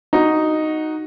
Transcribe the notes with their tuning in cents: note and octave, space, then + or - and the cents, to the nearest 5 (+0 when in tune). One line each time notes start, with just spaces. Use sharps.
D#4 +0 F#4 +0